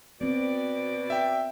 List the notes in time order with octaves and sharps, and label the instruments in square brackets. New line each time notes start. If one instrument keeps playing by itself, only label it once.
[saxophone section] B2 D5 [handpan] B3 C4
[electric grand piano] E5 G5